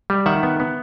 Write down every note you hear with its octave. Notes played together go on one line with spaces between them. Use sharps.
G3
D#3 E5 F#5
B3
B3